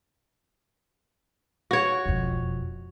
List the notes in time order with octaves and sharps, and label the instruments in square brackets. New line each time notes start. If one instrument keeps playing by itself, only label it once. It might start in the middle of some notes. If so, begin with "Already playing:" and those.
[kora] F#4 C#5
[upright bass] E1 F2